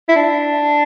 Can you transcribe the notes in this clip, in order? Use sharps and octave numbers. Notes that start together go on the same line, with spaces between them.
E4
D4